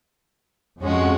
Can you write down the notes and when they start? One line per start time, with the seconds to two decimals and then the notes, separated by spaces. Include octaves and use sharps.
0.81 F2 F3 G#3 C#4 F#4